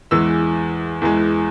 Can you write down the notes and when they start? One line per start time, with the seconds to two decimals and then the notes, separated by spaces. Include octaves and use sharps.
0.11 E2 E3 G#3 E6
1.02 E2 E3 G#3